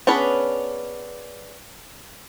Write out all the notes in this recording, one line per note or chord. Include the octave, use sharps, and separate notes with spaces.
B3 C#4 D4 G#4 B4